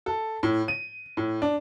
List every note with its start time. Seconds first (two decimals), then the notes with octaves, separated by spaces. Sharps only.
0.06 A4
0.43 A2
0.68 D#7
1.17 A2
1.42 D4